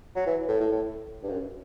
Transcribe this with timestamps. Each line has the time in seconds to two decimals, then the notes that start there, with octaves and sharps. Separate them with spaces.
0.16 F#3
0.27 E3
0.48 A2
0.60 A2
0.72 A2
1.23 G2
1.30 F#2